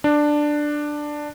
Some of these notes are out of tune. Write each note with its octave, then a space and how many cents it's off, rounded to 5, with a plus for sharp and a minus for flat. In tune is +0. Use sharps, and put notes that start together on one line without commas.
D4 +10